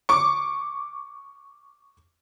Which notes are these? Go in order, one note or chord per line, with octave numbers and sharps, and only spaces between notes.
C#6 D6